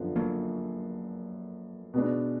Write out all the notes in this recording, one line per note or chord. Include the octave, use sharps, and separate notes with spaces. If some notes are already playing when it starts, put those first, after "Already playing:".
Already playing: F#2 D3 F3 B3
F#3 A#3
B2 G#3 D4